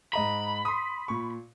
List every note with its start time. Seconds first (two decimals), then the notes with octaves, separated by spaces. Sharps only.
0.13 G#2 D#5 A#5 B5
0.65 C6 D#6
1.08 A#2 C#6